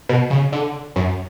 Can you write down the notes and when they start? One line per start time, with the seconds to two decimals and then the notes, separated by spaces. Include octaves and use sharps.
0.09 B2
0.30 C#3
0.52 D3
0.96 F#2